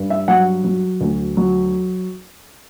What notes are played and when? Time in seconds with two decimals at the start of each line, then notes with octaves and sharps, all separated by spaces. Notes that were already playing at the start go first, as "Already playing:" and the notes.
Already playing: G2
0.10 E5
0.28 F#3 F#5
0.64 F#3
1.01 D2
1.37 F#3